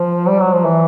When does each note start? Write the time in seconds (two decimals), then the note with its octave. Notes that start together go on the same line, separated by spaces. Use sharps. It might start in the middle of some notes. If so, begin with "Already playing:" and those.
Already playing: F3
0.27 G3
0.40 F#3
0.52 F3
0.65 E3